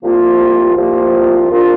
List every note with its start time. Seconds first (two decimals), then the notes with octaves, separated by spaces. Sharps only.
0.02 C2 C3 F3 A#3 F4
0.76 C2 C3 F3 A#3 F4
1.50 C2 A#2 A#3 D4 F4